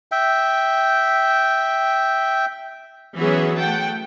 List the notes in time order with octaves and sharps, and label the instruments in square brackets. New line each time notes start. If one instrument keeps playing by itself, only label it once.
[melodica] E5 G5
[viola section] E3 F#3 B3 C#4 G#4 E5
A3 F#5 G5 A5